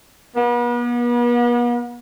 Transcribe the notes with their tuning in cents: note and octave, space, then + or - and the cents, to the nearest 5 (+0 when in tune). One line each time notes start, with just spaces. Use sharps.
B3 -40